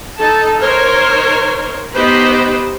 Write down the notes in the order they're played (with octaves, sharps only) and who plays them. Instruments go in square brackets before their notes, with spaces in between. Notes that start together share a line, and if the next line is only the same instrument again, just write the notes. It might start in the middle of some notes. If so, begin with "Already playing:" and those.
[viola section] D#4 A4 A5
D#4 A#4 C5 C#5
B3 D#4 G4 B4 C5